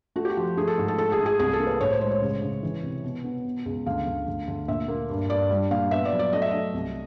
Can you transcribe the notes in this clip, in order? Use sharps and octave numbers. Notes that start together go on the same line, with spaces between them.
A3 F#4
G4
F#4
F3
A3 G#4
A4
G#2
A4
A3 A4
G#4
A3
G#4
C2 G#4
A4
A#3
B4
A2 C#5
C5
G#3 C5
C#5
C#3
C#3
E3
C3
B2
B3
B2
C#2
D2 F5
D2
D2
D2
A#2 E5
A#3
G2
G2 D5
G3
A#2 F5
B3 E5
D5
F#3
D5
A3 D#5
E5
A3 D#5
C2